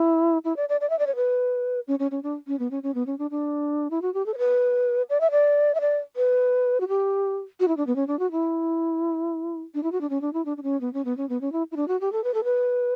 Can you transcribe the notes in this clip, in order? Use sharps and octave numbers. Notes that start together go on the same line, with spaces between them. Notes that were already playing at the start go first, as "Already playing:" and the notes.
Already playing: E4
E4
D5
D5
D5
E5
D5
C#5
B4
C#4
C#4
C#4
D4
C#4
B3
C#4
C#4
B3
C#4
D4
D4
E4
F#4
G4
A4
C#5
B4
D5
E5
D5
E5
D5
B4
F#4
G4
F#4
E4
D4
B3
C#4
D4
F#4
E4
D4
E4
F#4
D4
C#4
D4
E4
D4
D4
C#4
B3
C#4
B3
C#4
B3
C#4
E4
E4
D4
F#4
G4
A4
B4
A4
B4